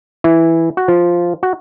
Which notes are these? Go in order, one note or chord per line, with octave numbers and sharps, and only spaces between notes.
E3 E4
F#4
F3 F4
F#4